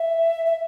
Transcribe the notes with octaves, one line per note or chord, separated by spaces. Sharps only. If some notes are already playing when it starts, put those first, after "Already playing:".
Already playing: E5
E5